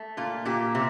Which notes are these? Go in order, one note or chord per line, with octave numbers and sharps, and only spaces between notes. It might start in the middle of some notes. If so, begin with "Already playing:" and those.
Already playing: A3
A#2 F4
A#2 G4
C3